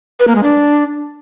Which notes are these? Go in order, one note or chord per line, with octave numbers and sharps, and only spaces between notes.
B4
A#3
G#3
D4